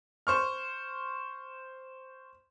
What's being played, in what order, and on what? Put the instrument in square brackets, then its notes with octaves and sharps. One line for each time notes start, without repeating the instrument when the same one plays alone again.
[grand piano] C5 C#6 F6